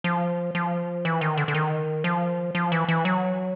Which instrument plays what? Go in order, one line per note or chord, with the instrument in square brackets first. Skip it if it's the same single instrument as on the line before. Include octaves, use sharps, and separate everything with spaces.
[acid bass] F3
F3
E3
D#3
D3
D3
D#3
F3
F3
E3
E3
F#3